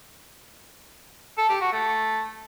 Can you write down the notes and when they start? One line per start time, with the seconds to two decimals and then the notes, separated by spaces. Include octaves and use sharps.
1.38 A4
1.49 G4
1.61 F#4
1.73 A3